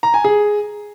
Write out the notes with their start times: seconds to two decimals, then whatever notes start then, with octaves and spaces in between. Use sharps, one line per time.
0.03 A#5
0.14 G#5
0.24 G#4